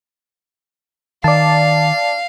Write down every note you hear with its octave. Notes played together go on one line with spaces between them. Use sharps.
D#3 D5 F5 A5